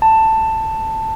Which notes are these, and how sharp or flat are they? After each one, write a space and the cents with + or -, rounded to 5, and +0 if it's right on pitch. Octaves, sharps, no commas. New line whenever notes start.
A5 +10